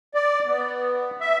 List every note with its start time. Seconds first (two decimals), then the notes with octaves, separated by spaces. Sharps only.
0.14 D5
0.47 B3
1.21 E5